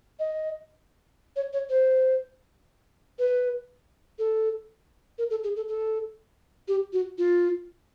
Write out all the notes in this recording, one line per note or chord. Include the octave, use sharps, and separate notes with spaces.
D#5
C#5
C#5
C5
B4
A4
A#4
A4
G#4
A4
A4
G4
F#4
F4